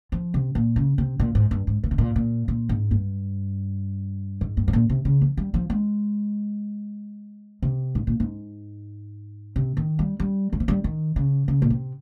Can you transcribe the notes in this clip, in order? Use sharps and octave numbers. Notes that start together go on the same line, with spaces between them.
F3
C3
A#2
C#3
C3
A#2
G#2
G2
G#2
A#2
C3
A#2
A#2
A#2
G#2
G2
G#2
G2
G#2
A#2
C3
C#3
F3
G3
F3
G#3
C3
G#2
A#2
G#2
C3
D#3
G3
G3
G3
F3
G3
D#3
C#3
C#3
A#2
C3